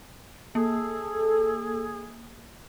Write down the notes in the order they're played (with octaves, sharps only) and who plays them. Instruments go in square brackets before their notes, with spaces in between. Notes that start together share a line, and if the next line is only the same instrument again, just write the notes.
[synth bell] A#3 [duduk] G#4 [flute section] A4